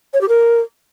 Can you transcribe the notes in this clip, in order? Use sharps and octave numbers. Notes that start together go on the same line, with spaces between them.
C#5
G4
A#4